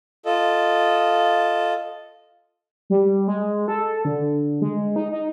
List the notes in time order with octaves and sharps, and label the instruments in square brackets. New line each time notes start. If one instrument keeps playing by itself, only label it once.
[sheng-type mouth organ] F4 A4 D#5
[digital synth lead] G3
G#3
A4
D3
G#3
D#4
D#4